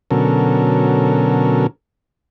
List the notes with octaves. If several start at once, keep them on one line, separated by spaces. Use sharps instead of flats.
B2 D3 F#3 C#4 A4 A#4